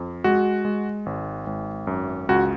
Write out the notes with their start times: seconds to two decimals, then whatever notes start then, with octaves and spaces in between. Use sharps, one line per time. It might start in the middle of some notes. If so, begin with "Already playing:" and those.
Already playing: F2
0.24 G#3 F#4
0.65 G#3
1.06 G#1
1.47 G#1
1.87 F#2
2.29 C#2 F#4